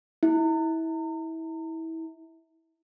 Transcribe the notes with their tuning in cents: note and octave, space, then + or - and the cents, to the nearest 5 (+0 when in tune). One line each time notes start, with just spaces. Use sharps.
E4 -25